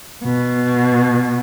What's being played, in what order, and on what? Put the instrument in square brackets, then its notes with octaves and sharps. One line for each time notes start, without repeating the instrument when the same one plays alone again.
[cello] B2